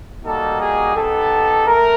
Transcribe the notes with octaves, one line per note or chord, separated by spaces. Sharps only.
G3 A#3 D#4 F#4 A4
G#4
B3 D#4 G4 A4
A3 A#4